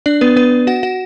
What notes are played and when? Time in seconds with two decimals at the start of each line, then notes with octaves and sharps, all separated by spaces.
0.06 D4 D5
0.21 B3 B4
0.36 B3 B4
0.67 F#4 F#5
0.83 F#4 F#5